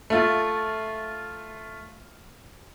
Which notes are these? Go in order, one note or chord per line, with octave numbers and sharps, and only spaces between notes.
A3 F4